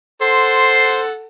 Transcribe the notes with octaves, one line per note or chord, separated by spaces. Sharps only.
A4 C5 F#5 C6